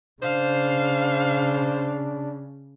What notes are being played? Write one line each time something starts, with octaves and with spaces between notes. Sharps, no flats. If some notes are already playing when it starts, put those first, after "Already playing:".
C#3 D4 C5 F5